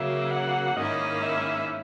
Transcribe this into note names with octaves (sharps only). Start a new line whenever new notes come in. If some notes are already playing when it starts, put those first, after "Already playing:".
Already playing: C#3 F#3 A#3 E5
F#5
G#2 D#3 A#3 C#4 E4 D#5
E5